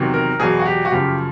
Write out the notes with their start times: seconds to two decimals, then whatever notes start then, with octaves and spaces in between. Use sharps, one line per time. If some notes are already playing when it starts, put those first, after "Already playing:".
Already playing: E2 C3 D#3 F#3
0.14 A#4
0.40 E2 B2 F#3 G#4
0.59 F#4
0.66 G4
0.85 F#4
0.91 F#2 C#3 F3 G4